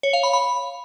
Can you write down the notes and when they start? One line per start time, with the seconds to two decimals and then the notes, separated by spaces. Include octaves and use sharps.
0.03 C#5
0.13 F5
0.23 B5
0.33 B5